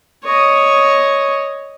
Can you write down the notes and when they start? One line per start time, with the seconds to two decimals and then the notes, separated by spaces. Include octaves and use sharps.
0.24 C#5 D#5